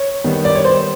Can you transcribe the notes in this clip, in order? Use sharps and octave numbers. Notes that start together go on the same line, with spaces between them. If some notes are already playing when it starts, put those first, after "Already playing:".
Already playing: C#5
D#3 G3 B3
D5
C#5
C5